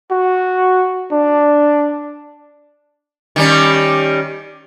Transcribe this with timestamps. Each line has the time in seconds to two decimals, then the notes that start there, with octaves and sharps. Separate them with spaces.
0.11 F#4
1.12 D4
3.36 D#3 G3 C#4